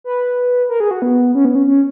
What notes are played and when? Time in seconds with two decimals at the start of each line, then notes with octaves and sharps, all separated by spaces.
0.04 B4
0.69 A#4
0.80 G#4
0.91 F#4
1.02 B3
1.35 C#4
1.45 B3
1.55 C#4
1.67 C#4